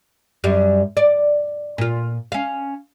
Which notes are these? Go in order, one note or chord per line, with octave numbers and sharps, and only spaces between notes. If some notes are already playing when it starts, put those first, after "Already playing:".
F#2 G3
D5
A#2 F4
C#4 F5